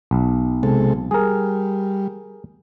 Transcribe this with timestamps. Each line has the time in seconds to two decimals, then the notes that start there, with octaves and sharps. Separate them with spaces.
0.11 B1
0.63 C3 G#3 A4
1.11 G3 G#4 A#4